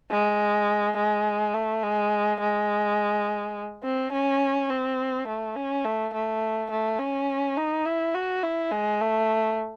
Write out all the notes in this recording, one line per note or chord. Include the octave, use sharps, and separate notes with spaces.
G#3
G#3
A3
G#3
G#3
C4
C#4
C4
A3
C#4
A3
A3
A3
C#4
D#4
E4
F#4
E4
G#3
A3